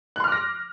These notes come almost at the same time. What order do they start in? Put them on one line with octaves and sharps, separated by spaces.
F#6 C6 F6 D6 A#6